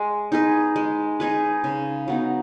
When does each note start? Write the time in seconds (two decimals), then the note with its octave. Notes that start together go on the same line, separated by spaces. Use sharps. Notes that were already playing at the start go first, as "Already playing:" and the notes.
Already playing: G#3
0.32 D#4 G#4 B4
0.76 G#3
1.20 D#4 G#4 B4
1.64 C#3
2.08 F#3 B3 D#4